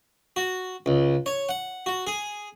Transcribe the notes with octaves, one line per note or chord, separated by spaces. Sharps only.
F#4
C#2
C#5
F#5
F#4
G#4